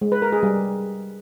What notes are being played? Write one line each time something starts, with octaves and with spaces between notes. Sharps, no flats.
G#3
B4
A#4
G#4
G3